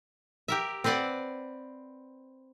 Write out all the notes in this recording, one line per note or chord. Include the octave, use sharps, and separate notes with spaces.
G4 A#4 E5
C4 B4 C5 D5 F#5